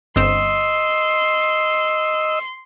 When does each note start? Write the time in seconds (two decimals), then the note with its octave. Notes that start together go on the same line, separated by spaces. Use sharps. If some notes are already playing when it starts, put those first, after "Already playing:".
0.16 G1 C4 D#5 C6 E6 E7